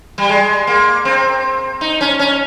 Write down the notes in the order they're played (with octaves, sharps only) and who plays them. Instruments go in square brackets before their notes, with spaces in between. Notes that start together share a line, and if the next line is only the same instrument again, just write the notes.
[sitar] G3
G#3
A#3
C4
D#4
C#4
C#4